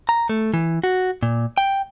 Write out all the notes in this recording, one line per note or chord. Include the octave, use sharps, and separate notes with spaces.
A#5
A3
E3
F#4
A#2
G5